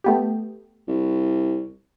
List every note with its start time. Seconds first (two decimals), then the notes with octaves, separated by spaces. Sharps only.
0.04 A3 B3 G4
0.88 C2